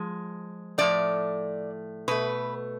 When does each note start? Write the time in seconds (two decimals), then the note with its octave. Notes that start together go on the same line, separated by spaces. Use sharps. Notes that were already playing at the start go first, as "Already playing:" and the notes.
Already playing: F3 G#3
0.78 A2 F3 A3 D5
2.08 B2 A3 B4